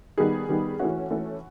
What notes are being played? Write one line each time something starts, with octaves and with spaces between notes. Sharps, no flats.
D#3 G3 B3 D#4 G#4
D#3 G3 B3 D#4
E3 A3 C#4 F#4
E3 A3 C#4